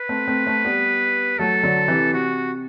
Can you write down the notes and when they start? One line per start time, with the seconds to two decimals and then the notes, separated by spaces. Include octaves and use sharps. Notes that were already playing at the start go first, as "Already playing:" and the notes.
Already playing: B4
0.09 A3 C4
0.28 A3 C4
0.46 A3 C4
0.64 G3 B3
1.39 F#3 A3 A4
1.63 D3 F#3
1.88 C3 E3
2.13 C3 F#4